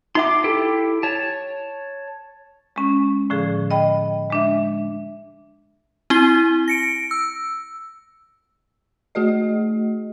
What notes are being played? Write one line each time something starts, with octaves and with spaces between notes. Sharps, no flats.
D#4 E5 F#5 C6 D6
E4 G4 A4
C#5 A5
G#3 C#4
A2 D3 F3 G#4
D#5 G5 B5
G#3 D4 E5
C4 E4 G7
A#6 C#7 D7
E6
A3 F#4 G#4 D#5